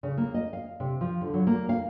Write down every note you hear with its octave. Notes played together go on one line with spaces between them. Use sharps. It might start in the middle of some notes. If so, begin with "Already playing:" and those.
C#3
A#3
D#5
F5
C3
F3
D3
F#3
A#3
F5